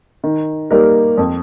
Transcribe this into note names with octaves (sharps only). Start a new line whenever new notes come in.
D#3
G3 A#3 D#4 A#4
F2